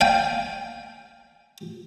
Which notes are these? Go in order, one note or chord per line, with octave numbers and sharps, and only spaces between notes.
F5 G5 G#5